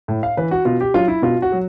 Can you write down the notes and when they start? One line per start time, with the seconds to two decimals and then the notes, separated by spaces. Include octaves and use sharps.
0.08 A2
0.23 F5
0.37 E3 B4
0.51 F#4
0.65 B2 F4
0.80 G4
0.94 F#3 F4
1.08 E4
1.22 B2 F4
1.42 F#4
1.52 F#3